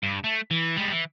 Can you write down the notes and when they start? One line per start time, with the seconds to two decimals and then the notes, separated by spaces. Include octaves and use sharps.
0.03 G2
0.24 A3
0.51 E3
0.76 G3 G#3
0.92 E3